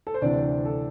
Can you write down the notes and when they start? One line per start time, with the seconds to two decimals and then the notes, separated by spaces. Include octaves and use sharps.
0.07 A4
0.14 C5
0.22 D2 C3 E3 D4 D5
0.65 A4